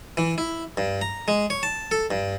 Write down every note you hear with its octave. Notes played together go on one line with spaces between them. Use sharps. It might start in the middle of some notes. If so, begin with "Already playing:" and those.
E3
E4
G2
A#5
G#3
C#5
A5
A4
G2